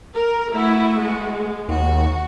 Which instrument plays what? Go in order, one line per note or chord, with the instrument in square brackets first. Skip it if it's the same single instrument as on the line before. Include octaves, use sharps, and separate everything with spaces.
[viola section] A#4
[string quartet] A3 B3 F#4 [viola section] E4
[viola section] G#3
[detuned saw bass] D#2 [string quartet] F#4